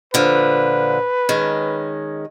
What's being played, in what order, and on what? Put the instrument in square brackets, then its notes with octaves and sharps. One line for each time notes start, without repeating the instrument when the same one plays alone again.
[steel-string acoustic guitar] A#2 D3 F3 [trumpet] B4
[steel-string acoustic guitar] D#3 G#3 C#4